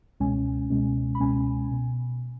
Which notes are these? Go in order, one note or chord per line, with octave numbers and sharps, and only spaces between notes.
C#2 B2 G#3 C#4 G#5
C#2 B2 G#3 C#4
B5
C#2 B2 G#3 C#4 G#5
B2